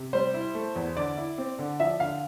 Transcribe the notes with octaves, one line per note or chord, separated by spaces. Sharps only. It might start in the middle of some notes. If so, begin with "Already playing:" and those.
Already playing: C3
G3 C5
E4
A3
E2
D3 D5
E4
C4
D3
F3 E5
D3 F5